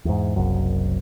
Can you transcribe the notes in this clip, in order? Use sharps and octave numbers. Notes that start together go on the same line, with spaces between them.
E2 G#2
F#1 C2 F#2